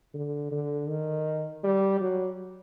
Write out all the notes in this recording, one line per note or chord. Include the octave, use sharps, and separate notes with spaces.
D3
D3
D#3
G3
F#3